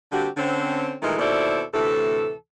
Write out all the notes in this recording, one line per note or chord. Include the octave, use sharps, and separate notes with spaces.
D3 G3 A#3 C4 F#4 G4
D3 C4 C#4
A#2 D#3 E3 G#3 A3
D#2 B2 E4 A4 C5 D5
D2 A2 C3 E3 A4